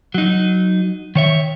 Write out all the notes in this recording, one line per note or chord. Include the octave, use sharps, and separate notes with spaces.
F#3 D#4
D#3 C#5 E5